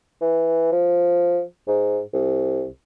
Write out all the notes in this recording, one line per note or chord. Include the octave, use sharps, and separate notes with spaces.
E3
F3
G#2
C2